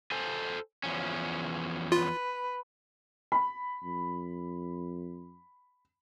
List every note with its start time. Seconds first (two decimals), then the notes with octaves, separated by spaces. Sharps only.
0.11 A4 C5 G#5
0.84 E2 F3 C#4
1.92 F4 B4
3.32 B5
3.83 F2